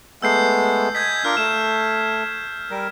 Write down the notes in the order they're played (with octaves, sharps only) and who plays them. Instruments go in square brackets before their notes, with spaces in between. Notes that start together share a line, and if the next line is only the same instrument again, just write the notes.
[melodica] G#3 A3 B3 [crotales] E6 G6 C7
[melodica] D#5 G#5 [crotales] G6 G#6 B6
[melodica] D4 F4 A#4 [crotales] F6
[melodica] A3 [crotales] E7
[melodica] G3 A#4